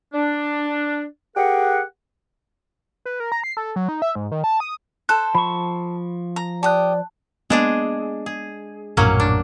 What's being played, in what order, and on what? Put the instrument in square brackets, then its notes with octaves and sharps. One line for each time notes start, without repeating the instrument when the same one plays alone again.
[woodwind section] D4
G4 G#4 A#4 F#5
[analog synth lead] B4
A#4
A#5
C7
A4
F#3
D#4
E5
G#2
D#3
A5
D#6
[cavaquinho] A4 C5 [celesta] F#6
[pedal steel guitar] F3 C#6 [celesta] B5
[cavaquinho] A#5
[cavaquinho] G4 D#6 [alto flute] D5 [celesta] A5 F#6
[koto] G#3 D4 G#4 [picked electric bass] A#3 B3
[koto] G#4
[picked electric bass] A#1 F#2 A2 [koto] F#3 A#3 C#4
[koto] D4